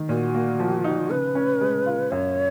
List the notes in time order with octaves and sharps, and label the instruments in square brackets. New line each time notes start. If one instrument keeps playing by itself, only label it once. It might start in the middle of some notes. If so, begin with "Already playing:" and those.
Already playing: [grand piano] D#3
[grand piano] A#2 [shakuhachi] F#4
[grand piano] A#3
F3
D#4
[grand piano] C#3 [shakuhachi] B4
[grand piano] C#4
G#3
F4
[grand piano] F#2 [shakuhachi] C#5